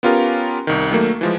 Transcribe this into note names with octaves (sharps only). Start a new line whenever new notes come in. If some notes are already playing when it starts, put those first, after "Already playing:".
B3 C#4 F4 G4 A#4
C2 D#3
D#3 F#3 A3 A#3
E3 F3 G#3